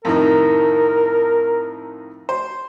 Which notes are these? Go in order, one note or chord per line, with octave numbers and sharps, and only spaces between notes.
F2 A2 D#3 A#4
C5